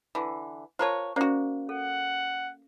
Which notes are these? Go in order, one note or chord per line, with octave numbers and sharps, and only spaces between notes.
D3 E3
F4 A#4 C5 C#5 A5
A#3 C#4 F#4 C5 D5
A4 F#5